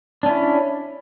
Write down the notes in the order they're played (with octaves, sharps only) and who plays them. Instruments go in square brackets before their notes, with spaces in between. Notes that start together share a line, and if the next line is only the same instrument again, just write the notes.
[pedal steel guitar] D4
C#4
E4